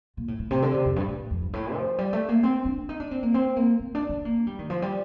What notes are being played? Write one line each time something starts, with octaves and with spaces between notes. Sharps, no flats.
A#2
A2
A2
C3
D3
C3
F2
G2
A2
F2
G2
A2
F3
G3
A3
A#3
C4
D4
D#4
D4
C4
A#3
C4
A#3
C4
D4
D4
A#3
G3
D#3
F3
G3